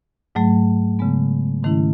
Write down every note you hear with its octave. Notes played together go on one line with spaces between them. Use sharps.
G#2 F#3 A3
C#3 G#3 B3
G#2 D#3 A3 C#4 E4